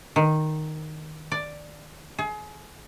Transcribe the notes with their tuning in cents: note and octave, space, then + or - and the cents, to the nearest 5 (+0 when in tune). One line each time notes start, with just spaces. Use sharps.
D#3 -5
D5 +5
G#4 +30